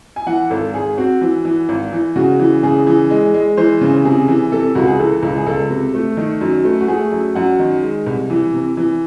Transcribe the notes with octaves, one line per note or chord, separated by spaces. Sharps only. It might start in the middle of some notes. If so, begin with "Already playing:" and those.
G#5
E3 F#5
G#1 A4
G#1 G#4
C4 F#4
E3
E3
G#1
E3
C#3 F#4
E3
C#3 G#4
E3
G#3
G#3
E3 C5
C#3
C3 G#4
E3
C3 A4
C#2 F#4
G#4
E3 A4
C#2
G#4
C#2 A4
C3
A3
D#3
F#2
A3
F#4
A3 G#4
F#2
F#2 F#5
D#3
G#3
C2
E3
C3
E3